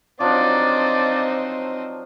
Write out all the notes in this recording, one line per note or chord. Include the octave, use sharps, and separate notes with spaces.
F3 F#3 C4 D4 D#4 D5